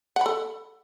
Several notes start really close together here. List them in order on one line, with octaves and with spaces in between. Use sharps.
F#5 B5 A4